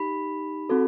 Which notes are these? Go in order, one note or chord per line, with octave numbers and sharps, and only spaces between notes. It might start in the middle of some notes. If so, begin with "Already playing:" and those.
Already playing: D#4 G4 B5
C4 F#4 A4